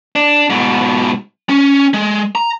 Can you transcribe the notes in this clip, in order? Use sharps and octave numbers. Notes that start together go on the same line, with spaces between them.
D4
G#2 B2
C#4
G#3
A#5